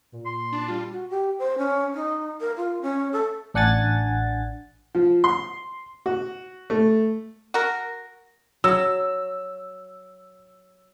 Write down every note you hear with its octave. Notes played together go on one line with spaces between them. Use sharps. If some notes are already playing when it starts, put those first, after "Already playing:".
A#2
C6
D4
G3 F4
F#4
G4
C5
C#4
D#4
A#4
F4
C#4
A4
A1 D4 F#5 G#5 A6
F3
C6
F#4
A3
F#4 A#4
F#3 E6